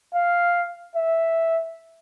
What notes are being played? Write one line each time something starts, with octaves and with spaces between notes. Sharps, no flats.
F5
E5